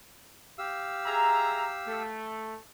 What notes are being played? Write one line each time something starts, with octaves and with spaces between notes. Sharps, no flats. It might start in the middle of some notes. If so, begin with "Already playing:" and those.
G4 F5 E6
G#4 E5 A#5
A3